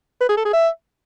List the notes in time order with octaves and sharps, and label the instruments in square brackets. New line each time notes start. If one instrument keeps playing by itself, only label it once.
[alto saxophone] B4
G#4
A4
G#4
E5